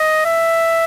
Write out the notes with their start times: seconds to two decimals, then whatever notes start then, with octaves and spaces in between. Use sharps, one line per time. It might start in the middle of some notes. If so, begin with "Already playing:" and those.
Already playing: D#5
0.26 E5